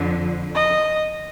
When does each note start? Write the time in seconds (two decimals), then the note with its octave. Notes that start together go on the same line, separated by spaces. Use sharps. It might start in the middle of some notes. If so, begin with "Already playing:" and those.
Already playing: F2 D3 F3
0.55 D#5